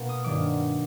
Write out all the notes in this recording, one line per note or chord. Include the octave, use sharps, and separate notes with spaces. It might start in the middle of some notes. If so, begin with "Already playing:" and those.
Already playing: B2 A#3
D#6
G2 D#3 F#3 D6